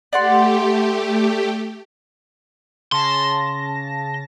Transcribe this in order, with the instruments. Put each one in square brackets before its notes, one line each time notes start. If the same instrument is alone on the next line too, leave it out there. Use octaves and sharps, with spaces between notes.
[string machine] A3 G4 [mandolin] D5 F#5 C6
[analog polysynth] C#3 A5 A#6 [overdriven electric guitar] C6